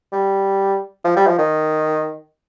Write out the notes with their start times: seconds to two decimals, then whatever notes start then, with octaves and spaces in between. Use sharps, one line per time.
0.12 G3
1.04 F3
1.16 G3
1.27 F3
1.39 D#3